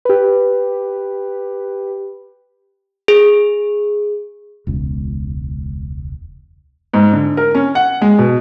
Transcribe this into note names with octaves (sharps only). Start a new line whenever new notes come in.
G4 B4
G#4
E1 C#2
G#2
D3
A#4
C#4
F#5
G#3
B2